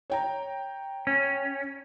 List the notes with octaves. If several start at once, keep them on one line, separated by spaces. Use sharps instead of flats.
C#5 G5 A#5
C#4